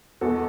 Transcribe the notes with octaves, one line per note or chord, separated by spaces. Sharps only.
E2 B2 G#3 F#4 A4